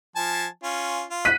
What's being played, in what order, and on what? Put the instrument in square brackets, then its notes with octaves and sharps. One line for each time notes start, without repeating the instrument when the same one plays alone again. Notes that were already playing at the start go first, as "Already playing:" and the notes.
[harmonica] F3 G#5 A5
C#4 F4
F4
[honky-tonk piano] F#6 B6 D#7